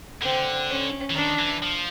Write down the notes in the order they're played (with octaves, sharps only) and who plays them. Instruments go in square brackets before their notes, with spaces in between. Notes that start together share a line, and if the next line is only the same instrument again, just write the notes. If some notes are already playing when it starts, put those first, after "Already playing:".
[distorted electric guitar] D3 [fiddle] C4
[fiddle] C#4
[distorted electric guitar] E3
[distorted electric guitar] D#3 [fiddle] D4
[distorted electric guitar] E3
F3